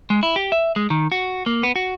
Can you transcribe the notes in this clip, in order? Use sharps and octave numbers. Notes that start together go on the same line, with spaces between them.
G#3
E4
G4
E5
G#3
D#3
F#4
A#3
B3
F#4